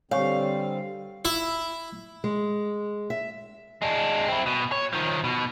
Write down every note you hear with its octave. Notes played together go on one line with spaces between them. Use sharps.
D3 G3 C4 C#5 F5 G#5 C#6
E4 E5
G#3
E5
G#3 D4
C4 E4
B2
C#5
D#3 F3
B2